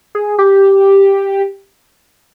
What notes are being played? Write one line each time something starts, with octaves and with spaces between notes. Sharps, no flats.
G#4
G4